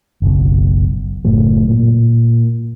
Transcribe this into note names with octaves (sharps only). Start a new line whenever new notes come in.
F#1 B1
F#1 A2 F#3
A#2